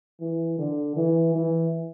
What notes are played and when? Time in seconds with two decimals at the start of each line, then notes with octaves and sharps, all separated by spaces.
0.21 E3
0.58 D3
0.97 E3
1.35 E3